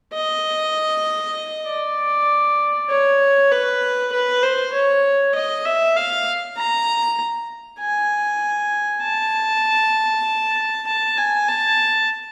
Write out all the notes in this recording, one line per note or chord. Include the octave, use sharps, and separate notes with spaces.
D#5
D5
C#5
B4
B4
C5
C#5
D#5
E5
F5
A#5
G#5
A5
A5
G#5
A5